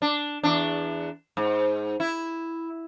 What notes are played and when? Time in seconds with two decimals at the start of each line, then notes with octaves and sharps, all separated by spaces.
0.02 D4
0.43 E2 D4
1.37 G#2
2.00 E4